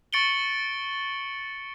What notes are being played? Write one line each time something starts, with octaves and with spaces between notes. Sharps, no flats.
C#6 A6 C#7 D7 F#7 G7